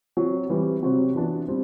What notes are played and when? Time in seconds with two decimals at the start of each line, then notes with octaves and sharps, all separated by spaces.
0.17 F#3 C4 F#4
0.50 E3 G3 C4
0.82 C3 F#3 C4 F#4
1.15 E3 B3 D4 F#4
1.48 G3 C4